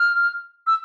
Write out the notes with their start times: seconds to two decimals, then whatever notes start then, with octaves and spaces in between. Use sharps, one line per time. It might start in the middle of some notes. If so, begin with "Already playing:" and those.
Already playing: F6
0.67 E6